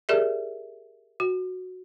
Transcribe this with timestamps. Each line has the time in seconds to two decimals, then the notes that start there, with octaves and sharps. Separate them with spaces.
0.09 G4 G#4 A#4 D5 E5
1.20 F#4